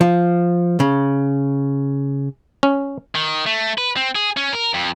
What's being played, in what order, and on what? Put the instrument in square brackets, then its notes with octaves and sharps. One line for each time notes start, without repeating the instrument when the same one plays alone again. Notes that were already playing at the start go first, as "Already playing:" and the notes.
[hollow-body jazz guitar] F3
C#3
[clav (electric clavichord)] C#4
[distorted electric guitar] D#3
A3
B4
C4
G#4
C#4
A#4
F2